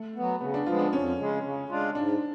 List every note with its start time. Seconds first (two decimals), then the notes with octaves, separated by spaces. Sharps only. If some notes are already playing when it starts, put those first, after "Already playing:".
Already playing: A3
0.15 F#3 B3
0.41 C#3 B3
0.54 D4
0.66 F3 G#3 B3 F4
0.79 D4
0.93 F2 C#4
1.18 C#3 G#3
1.43 C#3
1.69 G#3 D4 F4
1.95 G#2 D4